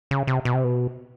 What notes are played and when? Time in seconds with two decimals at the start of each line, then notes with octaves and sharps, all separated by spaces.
0.11 C#3
0.27 C3
0.45 B2
0.54 C3
0.64 B2